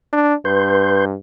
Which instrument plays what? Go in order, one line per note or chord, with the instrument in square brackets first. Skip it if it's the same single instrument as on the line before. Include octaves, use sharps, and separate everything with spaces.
[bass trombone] D4
[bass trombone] G2 [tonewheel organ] B4 C6 G6